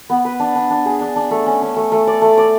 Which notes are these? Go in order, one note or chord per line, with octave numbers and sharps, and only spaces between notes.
B3
B4
D4
D4
D4
G#4
D4
D4
A3
C#4
C#4
A3
A3
D5
A3
D5